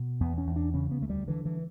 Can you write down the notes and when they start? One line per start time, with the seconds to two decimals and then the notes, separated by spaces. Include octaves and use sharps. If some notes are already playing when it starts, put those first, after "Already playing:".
Already playing: B2
0.20 E2 B3
0.38 C#4
0.47 E2
0.56 D4
0.74 C#3 C#4
0.91 B3
1.01 D2 A3
1.10 G3
1.28 D3 E3
1.45 E3